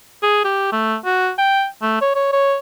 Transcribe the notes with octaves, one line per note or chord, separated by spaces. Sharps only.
G#4
G4
A3
F#4
G5
A3
C#5
C#5
C#5